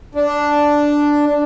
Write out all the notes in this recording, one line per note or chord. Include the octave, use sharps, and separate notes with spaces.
D4